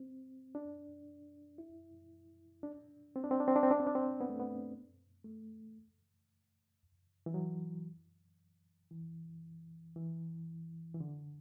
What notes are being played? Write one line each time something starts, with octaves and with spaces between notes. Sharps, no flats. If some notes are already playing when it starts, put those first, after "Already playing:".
Already playing: C4
D4
E4
D4
C4
D4
C4
D4
C4
D4
C4
D4
C4
D4
C4
B3
A3
B3
A3
E3
F#3
E3
E3
E3
D3